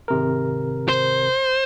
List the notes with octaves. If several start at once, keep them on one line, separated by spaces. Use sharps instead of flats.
G#1 C3 A#4
C5